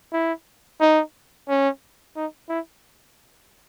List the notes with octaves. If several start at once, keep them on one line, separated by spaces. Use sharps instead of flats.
E4
D#4
C#4
D#4
E4